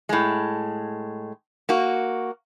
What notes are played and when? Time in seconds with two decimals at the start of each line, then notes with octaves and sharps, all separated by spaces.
0.09 A2 G#3
1.69 A#3 F#4